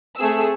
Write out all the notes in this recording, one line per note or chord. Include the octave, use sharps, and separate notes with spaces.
A3 C4 G#4 E6